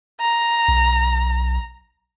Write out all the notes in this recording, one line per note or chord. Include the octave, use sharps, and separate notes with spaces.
A#5
B1